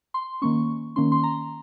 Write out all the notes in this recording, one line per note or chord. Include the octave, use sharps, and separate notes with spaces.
C6
D#3 A#3 C#4 C#6
D#3 A#3 C#4 C6
C6
A#5